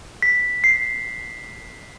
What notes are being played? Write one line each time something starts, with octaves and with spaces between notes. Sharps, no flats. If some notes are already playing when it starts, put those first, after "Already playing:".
B6
C7